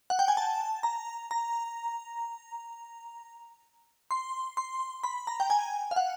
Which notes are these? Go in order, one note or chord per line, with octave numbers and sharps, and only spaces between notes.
F#5
G5
G#5
A5
A#5
A#5
C6
C6
B5
A#5
G5
G#5
F5
F#5